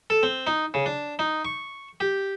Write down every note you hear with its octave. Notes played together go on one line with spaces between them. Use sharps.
A4
C4
D#4
C#3
D4
D#4
C#6
G4